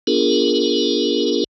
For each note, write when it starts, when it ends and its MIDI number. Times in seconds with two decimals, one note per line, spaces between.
0.07 1.44 59
0.07 1.44 62
0.07 1.44 65
0.07 1.44 68
0.07 1.44 70